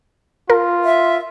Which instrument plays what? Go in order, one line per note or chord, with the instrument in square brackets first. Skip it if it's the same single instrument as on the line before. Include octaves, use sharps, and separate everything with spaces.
[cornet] F4 [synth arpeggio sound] A#4
[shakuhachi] E5